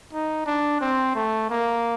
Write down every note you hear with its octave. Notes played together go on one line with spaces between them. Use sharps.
D#4
D4
C4
A3
A#3